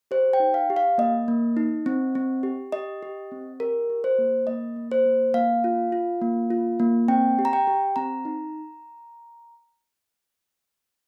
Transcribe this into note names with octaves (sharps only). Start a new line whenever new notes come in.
G4 C5
G5
D#4
F5
G4
F5
A#3 D#5
A#3
D#4
C4
C4
G4
G4 D#5
G4
C4
G4 A#4
G4
C5
A#3
A#3 D#5
A#3
C5
A#3
A#3 F5
F4
F4
A#3
F4
A#3
C4 G5
G4
A#5
G5
G4
C4 A#5
D#4